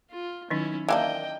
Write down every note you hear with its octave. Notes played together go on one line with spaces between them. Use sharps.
F4
D#3 F#3 C#4 D#4 E4
E3 A#3 D4 D#5 G5